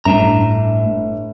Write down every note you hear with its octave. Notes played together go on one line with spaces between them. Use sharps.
G1 A2 D4 A#5